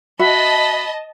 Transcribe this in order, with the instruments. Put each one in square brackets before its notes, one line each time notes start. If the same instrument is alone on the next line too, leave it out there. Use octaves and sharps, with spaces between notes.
[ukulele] F#4 E5 [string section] D#5 A5 [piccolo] B5